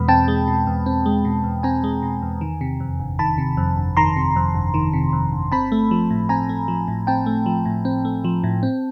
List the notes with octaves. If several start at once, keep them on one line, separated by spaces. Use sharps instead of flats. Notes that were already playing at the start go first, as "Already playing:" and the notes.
Already playing: E2 B2 G#3 B5
C4 G5 A5
G#3
B2
E2
C4
G#3
B2
E2
C4 G#5 A#5
G#3
B2
E2
D#3
C3
F2
G1
D#3 A5 B5
C3
F2
G1
D#3 A#5 C6
C3
F2
G1
D#3
C3
F2
G1
C4 A5 B5
A3
F3
A2
C4 G#5 A#5
A3
F3
A2
C4 G5 A5
A3
F3
A2
C4
A3
F3
A2
C4